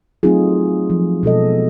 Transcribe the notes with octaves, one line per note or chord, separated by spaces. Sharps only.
F#3 A3 C4 D#4 F4 G#4
F3
B2 G#3 A4 D#5